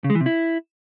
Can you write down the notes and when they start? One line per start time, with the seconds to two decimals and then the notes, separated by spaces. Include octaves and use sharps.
0.04 C#3
0.10 G#3
0.15 E3
0.21 C3
0.26 E4